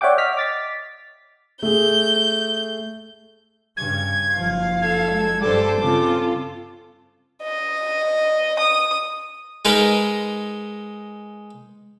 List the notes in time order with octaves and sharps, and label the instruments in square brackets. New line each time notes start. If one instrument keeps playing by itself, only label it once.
[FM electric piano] C#5 D5 E5 F#5 G5 D6
D#5 F6 B6
D6 A6 B6
[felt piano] A3 G#4 [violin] G6
[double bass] G2 C#3 [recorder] G#6
[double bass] F#1 F3 [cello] F5
[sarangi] A4 [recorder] G#6
[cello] G#3
[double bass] G2 [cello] G3 C5 [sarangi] A4 [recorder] D6
[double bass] C#3 [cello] C4 F4 [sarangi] A4
[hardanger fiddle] D#5
D#6
[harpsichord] G#3 D#4 A#4 B4